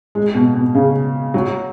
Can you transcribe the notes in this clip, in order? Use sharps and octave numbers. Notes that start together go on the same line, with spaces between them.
G#3
B2
B2
C#3
F#3